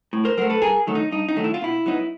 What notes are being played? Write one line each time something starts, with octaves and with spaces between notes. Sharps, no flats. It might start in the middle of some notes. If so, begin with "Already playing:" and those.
A2
A#4 C5
F#3 A3 A#4 C5
A4 B4
G2 G#4 A#4
D#3 F#3 A3
D#4
G2 D#4
D#4
D#3 F#3 A3
E4
F4
B2 E4
F#3 B3 D#4